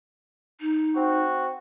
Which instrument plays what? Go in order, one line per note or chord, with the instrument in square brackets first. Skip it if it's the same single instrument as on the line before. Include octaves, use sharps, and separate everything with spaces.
[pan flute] D#4
[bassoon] C4 [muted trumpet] F#4